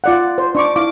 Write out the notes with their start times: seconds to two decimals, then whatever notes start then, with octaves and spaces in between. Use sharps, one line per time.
0.04 F4 D5 F#5
0.38 C5
0.55 D4 C#6 D6
0.76 E4 F5 D6